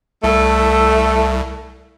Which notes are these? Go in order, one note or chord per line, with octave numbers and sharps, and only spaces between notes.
C2 A3 A4